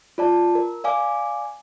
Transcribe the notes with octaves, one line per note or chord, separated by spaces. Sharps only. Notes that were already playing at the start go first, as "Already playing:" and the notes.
F4 D5 A5
A#4
D5 F5 G#5 D6